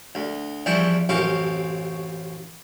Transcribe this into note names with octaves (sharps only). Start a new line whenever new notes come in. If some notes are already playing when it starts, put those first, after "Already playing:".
D2
E2 E3 F3 G3 C#6
A1 F#2 C3 F5 C#6